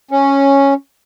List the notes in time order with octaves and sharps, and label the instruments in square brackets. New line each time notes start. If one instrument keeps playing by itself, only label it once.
[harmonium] C#4